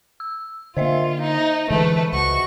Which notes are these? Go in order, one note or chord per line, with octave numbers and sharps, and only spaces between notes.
E6
D3 A#3 F4 C5 D#5 E5
D#4
D3 E3 G#3 A3 B4
C#2 F#4 C#6